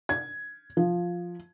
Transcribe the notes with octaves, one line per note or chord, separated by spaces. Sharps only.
G#6
F3